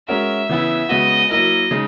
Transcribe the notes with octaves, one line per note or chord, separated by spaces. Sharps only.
G#3 C#4 F#4 A#4 E5
C#3 E3 B3 E4
C#3 G#3 B3 F#4 D#5
F#3 A#3 E4 A#4 D#5
C#3 G#3 D#4